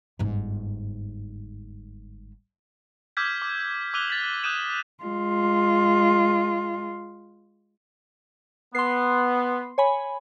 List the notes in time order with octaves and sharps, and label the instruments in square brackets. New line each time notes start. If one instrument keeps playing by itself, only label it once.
[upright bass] G1 G#2
[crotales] D6 E6 F6 G6 G#6 B6
D6
D6 E6 F#6 D#7 F7 G7
A6 B6 F#7
D#6 F#6 G6 D#7 E7
[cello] G#3 F4
[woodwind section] B3 [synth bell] C6 C7
[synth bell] C#5 G#5 B5